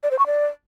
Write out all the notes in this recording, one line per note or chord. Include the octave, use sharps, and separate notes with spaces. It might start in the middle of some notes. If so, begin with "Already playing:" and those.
D5
C5
C#6
D5